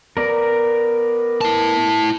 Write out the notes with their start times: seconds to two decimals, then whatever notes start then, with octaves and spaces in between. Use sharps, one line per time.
0.17 B3 A#4 D5 A#5
1.41 E4 A5